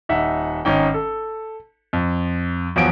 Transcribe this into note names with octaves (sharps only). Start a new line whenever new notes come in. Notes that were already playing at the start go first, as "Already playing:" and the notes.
D#1 D#4 E5 F#5
G#1 C#4 D#4 G5
A4
F2
E2 F3 F#3 D7